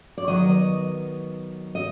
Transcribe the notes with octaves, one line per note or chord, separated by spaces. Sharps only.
D5
D#3 F#3 B3 D#5
D#5